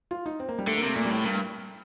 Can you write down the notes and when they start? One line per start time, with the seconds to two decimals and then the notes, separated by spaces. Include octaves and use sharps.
0.11 F4
0.26 D#4
0.40 C4
0.49 A#3
0.59 G3
0.67 D3 A3
0.77 A#3
0.82 C3 A3
0.95 A#2 A3
1.05 G3
1.11 A2 A3
1.24 G2 A#3